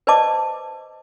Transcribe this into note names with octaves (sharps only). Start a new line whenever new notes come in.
B4 C5 D5 D#5 A5 D6